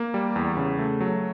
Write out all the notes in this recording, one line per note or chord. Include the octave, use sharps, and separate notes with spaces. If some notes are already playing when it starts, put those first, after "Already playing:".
Already playing: A#3
G3
E2
C#3
A3
F#3